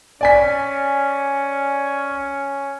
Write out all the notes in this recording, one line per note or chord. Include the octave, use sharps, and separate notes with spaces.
C#4 D5 G#5 B6